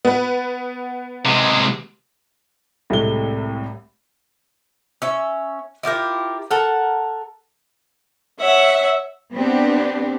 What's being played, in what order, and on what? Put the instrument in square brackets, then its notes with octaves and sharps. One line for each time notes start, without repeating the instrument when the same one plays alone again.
[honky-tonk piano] B3 B4
[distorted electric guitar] C3 G#3
[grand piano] C2 A2 C3 G#3 A3 G7
[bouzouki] C#4 E5
E4 F4 G4 A#4
A4 A#4 F#5
[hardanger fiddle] C#5 F#5 [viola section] E5
[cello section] B3 C4 D4 G4